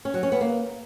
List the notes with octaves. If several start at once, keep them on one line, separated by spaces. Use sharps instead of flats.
C#4
F#3
C#4
B3
A#3